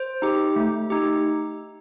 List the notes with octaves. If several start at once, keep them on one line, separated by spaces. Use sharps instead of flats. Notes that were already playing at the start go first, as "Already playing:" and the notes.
Already playing: C5
D#4 G4
A3
D#4 G4